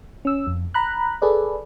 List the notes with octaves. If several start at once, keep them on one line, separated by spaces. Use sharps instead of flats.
C#4 E6
F2
A#5 B5 F#6
G#4 A4 B4 D5